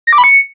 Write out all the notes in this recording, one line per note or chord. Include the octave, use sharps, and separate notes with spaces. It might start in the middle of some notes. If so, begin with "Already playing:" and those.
A#6
D6
B5
C#7